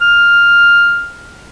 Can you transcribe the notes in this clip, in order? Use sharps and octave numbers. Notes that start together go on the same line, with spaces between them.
F6